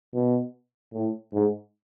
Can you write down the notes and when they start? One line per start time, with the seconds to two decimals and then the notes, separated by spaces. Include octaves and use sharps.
0.14 B2
0.94 A2
1.33 G#2